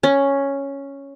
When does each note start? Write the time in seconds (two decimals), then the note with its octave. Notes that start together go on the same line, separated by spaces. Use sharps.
0.03 C#4